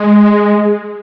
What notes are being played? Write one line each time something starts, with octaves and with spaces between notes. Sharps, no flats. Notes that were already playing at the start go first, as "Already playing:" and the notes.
Already playing: G#3